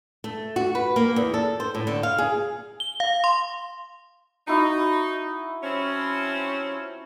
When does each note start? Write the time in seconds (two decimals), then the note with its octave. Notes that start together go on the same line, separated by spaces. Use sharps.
0.24 A3
0.56 F#4
0.75 B4
0.96 A#3
1.16 E2
1.34 A4
1.60 C5
1.75 A2
1.87 D3
2.03 F5
2.18 G#4
2.80 G7
3.00 F5
3.24 C6
4.48 D#4 E4 F#4 A#5
5.63 F3 C4 C#4